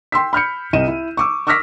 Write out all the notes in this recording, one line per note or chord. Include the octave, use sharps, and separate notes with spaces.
G5 C6 E6 B6
B5 F6 G6 C#7
C2 D#5 D#7 E7
E4
C#6 D6 E6
C#6 D6 E6 F6 A#6 B6